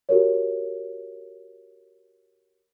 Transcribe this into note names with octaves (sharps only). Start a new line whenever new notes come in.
F#4 G4 A#4 C#5